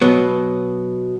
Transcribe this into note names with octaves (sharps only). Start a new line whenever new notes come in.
B2 F#3 B3